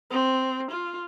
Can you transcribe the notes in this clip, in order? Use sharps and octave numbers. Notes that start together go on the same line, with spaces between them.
C4
F4